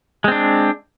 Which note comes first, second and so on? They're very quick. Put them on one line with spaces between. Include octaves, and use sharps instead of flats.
G#3 C4 D4